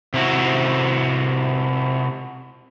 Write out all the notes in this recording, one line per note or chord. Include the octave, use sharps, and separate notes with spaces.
C3 E4 F#4